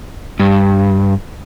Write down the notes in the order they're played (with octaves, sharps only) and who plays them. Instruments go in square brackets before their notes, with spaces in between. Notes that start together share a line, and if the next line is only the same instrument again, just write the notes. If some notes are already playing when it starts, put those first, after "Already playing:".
[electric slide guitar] G2